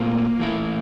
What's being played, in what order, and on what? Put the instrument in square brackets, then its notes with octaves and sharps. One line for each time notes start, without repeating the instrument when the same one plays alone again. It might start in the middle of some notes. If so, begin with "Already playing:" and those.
Already playing: [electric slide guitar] A#2 A3 C4 F4 [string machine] A#3
[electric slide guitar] E3 A3 E4